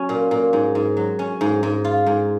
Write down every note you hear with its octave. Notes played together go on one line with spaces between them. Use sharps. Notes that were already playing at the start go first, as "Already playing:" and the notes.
Already playing: F#3 C#4
A#2
A#2
G#2
G#2
F#3
C#4
G#2
G#2
F4
G#2